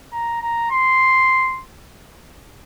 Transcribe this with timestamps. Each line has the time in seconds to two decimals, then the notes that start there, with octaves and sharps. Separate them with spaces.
0.12 A#5
0.41 A#5
0.71 C6